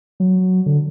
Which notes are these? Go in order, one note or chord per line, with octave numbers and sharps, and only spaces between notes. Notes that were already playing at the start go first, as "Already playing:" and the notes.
F#3
D3